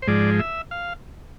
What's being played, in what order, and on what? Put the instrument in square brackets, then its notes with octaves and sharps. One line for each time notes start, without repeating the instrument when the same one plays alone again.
[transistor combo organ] C5
G#2 F3 G#3 D5
E5
F5